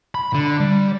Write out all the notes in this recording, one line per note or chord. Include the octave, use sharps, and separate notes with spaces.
B5
D3
G3